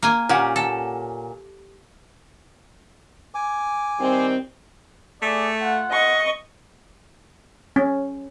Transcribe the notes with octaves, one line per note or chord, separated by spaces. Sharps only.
A#3 G#5
A#2 C#4 G4 F#5
A4
G#5 D6
D#3 G3 C4
A3 G#4 D5
F4 F#5
D#5 C#6
C#4